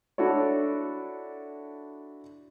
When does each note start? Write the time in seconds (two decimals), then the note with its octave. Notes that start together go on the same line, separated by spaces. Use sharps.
0.18 D4 E4 F#4 A4 C#5